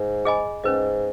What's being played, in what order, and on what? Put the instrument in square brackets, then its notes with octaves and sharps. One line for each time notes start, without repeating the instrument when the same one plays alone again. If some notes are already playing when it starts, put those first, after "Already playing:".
Already playing: [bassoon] G#2
[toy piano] G#4 D#5 G#5 B5
[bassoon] G#2 [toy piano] C#4 B4 D#5